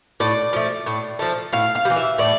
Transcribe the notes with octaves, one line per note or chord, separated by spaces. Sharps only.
A2 D5
F3 A3
A2
F3 A3
A2 F5
F5
G3
E3
E5
A2 D5